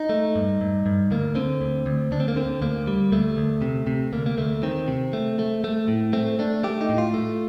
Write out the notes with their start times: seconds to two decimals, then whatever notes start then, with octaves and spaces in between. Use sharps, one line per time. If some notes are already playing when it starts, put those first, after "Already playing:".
Already playing: D#4
0.09 A3
0.35 G2
0.61 G2
0.86 G2
1.11 D2 A#3
1.35 D3 C4
1.61 D2
1.86 D2
2.12 D2 D4
2.20 C4
2.28 A#3
2.36 D3 C4
2.61 D2 A#3
2.87 G3
3.12 D2 A3
3.37 D2
3.62 C3
3.87 C3
4.13 D2 A#3
4.26 A#3
4.37 D2 A3
4.63 D#3 C4
4.88 C3
5.13 A3
5.39 A3
5.64 A3
5.88 A2
6.13 A3 C4
6.39 A3 D4
6.64 A3 G4
6.81 D#4
6.89 A2
6.98 F4
7.14 A3